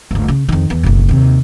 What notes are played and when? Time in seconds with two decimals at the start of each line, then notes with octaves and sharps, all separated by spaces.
0.11 G1 D2
0.28 C#3
0.49 F2 D#3
0.70 E2
0.83 F#1 B1
1.09 D#2 C3